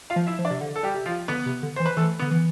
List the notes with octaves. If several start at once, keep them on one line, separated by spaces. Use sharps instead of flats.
F4 F5
F3
E4 E5
F3
D4 D5
C3
D3
A4
G3 G4
C3
F3 F4
D3 B3 B4
C3
D3
E3 C5
B4
E3 A3 A4
B3
D3
E3